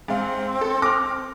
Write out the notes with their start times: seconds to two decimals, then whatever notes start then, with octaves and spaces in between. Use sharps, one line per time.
0.08 G#2 C4 F5
0.61 A4
0.82 D6 F6 A#6